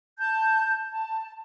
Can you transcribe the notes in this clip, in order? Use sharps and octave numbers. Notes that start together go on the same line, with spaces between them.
A5 G6
A5